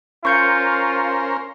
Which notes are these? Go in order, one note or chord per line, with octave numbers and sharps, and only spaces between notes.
C#4 F4 A#4 C5 C#6 G6 C#7